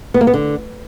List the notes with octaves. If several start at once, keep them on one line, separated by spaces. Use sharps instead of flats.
B3
A#3
B3
D3